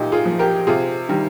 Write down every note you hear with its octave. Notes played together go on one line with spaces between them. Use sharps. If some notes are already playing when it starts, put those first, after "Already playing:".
Already playing: A#2 D#4 G4
F4 G#4
F3
G4 A#4
C3 F4 G#4
D#3 G3